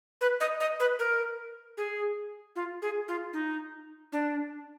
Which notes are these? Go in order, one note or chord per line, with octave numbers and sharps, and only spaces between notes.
B4
D#5
D#5
B4
A#4
G#4
F4
G#4
F4
D#4
D4